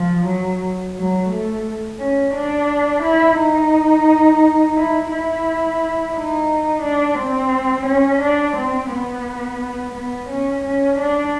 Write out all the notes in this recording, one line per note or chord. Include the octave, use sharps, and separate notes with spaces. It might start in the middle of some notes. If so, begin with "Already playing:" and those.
Already playing: F3
F#3
F#3
A3
C#4
D4
E4
D#4
E4
E4
D#4
D4
C4
C#4
D4
C4
B3
B3
C#4
C#4
D4